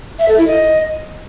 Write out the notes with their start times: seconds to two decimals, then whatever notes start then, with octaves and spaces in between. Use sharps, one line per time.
0.19 E5
0.28 A4
0.38 E4
0.47 D#5